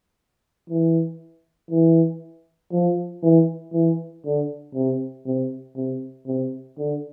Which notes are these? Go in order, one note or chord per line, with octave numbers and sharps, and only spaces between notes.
E3
E3
F3
E3
E3
D3
C3
C3
C3
C3
D3